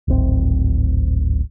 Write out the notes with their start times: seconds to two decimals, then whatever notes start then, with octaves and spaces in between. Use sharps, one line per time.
0.08 D1 G#1 C4